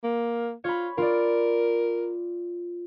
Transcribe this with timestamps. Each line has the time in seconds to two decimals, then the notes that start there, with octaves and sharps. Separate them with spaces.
0.04 A#3
0.64 F4 C#5 B5
0.98 F4 A#4 D5